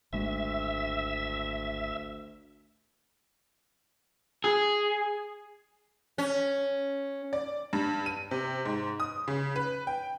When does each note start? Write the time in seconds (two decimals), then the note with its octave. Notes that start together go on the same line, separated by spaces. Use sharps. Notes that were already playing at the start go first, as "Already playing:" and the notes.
0.13 G#1 D2 G#3 A3 E5
4.44 G#4
6.18 C#4
7.33 D5
7.73 G2
8.06 D#7
8.31 C3
8.65 G#2
9.00 D#6
9.28 C#3
9.56 B4
9.87 G5